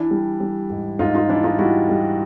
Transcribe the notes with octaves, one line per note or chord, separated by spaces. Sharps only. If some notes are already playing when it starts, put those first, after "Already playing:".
Already playing: E3 D4 E4
G3
G3
G#2
G#2 D#4 F4
D#4 F4
E3 D4 E4
D#4 F4
G3 E4 F#4
G3